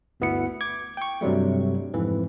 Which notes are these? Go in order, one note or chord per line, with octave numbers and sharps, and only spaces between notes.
G1 D2 B3 E4 C#7
D6 G#6
G5 C#6
G2 C3 F#3 G3 A3
F2 G#2 E3